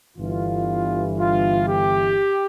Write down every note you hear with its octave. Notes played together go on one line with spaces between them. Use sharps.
G1 G2 E3 F4
F4
G4